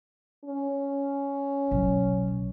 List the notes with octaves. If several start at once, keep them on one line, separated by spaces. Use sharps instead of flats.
C#4
B1